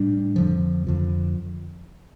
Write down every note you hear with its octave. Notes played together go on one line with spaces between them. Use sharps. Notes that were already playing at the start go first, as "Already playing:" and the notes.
Already playing: A2 G3 D4
F2 D3 F3
F2 D3 F3